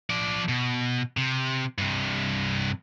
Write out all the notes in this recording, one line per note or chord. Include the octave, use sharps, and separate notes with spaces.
F3 D5
B2
C3
G2 C3